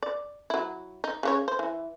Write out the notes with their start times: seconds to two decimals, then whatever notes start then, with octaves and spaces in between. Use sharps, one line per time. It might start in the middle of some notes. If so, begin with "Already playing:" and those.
0.03 D5
0.50 F#3 E4
1.04 D#4
1.23 C#3 F#4 C#5
1.48 C5
1.59 E3